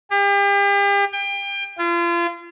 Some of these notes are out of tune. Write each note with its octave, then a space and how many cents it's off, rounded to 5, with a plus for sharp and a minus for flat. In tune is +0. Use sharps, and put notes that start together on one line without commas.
G4 +40
G5 +30
F4 -35